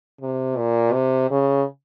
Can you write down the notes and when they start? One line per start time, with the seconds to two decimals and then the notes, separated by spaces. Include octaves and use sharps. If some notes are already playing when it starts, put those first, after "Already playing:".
0.21 C3
0.58 A#2
0.93 C3
1.30 C#3